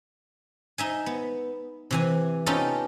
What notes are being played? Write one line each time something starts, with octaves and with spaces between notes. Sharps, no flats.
D#4 E5 G#5
B3
C3 E3 G#5
B3 C#4 D#4 F4 G4 A4